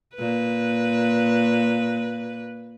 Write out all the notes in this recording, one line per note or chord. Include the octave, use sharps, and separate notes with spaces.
A#2 B4